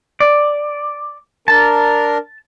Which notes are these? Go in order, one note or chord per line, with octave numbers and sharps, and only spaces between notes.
D5
D4 A#4 A5